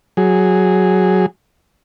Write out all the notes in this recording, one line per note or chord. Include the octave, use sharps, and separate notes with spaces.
F#3 G#4